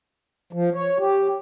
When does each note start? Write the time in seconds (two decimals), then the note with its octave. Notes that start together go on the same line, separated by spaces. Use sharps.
0.53 F3
0.74 C#5
0.99 G4